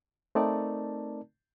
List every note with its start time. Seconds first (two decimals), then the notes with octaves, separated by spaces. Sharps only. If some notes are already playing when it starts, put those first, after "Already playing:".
0.35 A3 C4 D#4 A#4 D5 A5